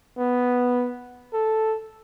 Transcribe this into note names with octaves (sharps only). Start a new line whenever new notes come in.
B3
A4